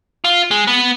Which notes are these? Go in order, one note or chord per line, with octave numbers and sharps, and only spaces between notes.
F4
G#3
B3